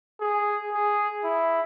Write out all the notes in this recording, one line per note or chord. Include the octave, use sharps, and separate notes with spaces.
G#4
G#4
E4